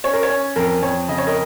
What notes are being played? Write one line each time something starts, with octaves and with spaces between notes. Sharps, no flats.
C#4 C#5
A#4
C#5
C#4
F2 A#4
F2 C#5
C#3 D#5
C#5
A#4 D#5